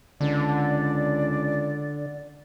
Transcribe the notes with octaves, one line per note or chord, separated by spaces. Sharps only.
C#2 D3 D5